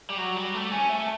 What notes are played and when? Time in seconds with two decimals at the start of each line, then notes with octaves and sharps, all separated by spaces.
0.10 G3
0.18 F#3
0.36 G3
0.54 A3
0.71 C#4
0.89 A3